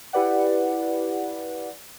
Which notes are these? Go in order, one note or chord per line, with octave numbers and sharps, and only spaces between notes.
E4 G4 B4 D5 F#5